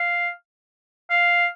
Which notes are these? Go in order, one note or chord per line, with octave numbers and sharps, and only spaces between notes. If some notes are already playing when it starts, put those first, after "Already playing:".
Already playing: F5
F5